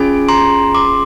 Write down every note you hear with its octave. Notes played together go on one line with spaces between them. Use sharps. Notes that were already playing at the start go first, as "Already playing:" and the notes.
Already playing: C#4 F4 G#4 G#5
A#5 C6
C6 D6